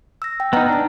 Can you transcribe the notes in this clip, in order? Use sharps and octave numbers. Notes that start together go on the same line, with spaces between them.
E6 A#6
G5
B3 D#4 D#5 A#5 F6
D4 D#4 A#5